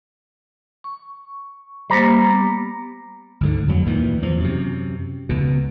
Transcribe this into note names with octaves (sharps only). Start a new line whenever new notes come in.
C#6
G3 A#3 G4 C5 A#5
B3
D2 G#2 D3
F2 F#3
D2 A#2 D#3 E3
E2 F3
F#2 C3
C#2 B2